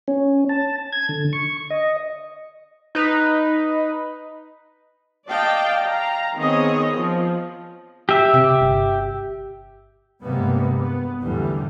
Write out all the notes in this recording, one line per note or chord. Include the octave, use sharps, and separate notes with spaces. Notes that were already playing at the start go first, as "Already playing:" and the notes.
C#4
A5
G#6
D3
C#6
D#5
D#4 B4
D5 D#5 F5 G5 A5
F5 A#5
D#3 B3 C4 G#4 C#5 D#5
F3
G4 E5
C3
G1
G2 C3 G3 G#3 A#3 B3
B3
A1 E2 D3 E3 G3